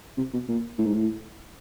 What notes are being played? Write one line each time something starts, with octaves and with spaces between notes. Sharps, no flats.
C3
B2
A#2
A2
G#2
A2